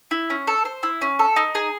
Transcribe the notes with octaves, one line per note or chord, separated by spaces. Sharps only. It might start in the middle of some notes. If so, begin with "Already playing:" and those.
E4
C#4
A4
C5
E4
C#4
A4
D#4
G#4